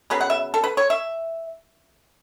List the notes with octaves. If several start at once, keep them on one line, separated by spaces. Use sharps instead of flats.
C#3 F#3 B3 B4
F#5
E5
A4
B4
C#5
E5